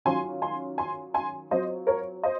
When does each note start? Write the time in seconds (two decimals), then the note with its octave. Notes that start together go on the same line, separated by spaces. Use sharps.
0.05 D#3 F#3 C#4 F4 G#5 C6
0.42 G#5 C6
0.78 G#5 C6
1.14 G#5 C6
1.51 F#3 C4 F4 C5 D#5
1.87 A#4 C#5
2.23 C5 D#5